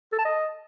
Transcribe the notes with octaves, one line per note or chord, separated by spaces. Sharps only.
A4
A5
D#5